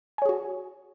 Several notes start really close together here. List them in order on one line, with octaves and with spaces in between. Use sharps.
G#5 C#5 G#4 F#4